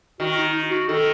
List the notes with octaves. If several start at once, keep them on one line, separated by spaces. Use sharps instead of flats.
D#3 F#4
D#4
D#4
F#4
D#3 A4